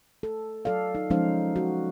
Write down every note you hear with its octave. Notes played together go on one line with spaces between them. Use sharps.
A4
F#3 A4 D5 F5
D#4
F3 G#3 C#4 D#4 C5 F5
F#4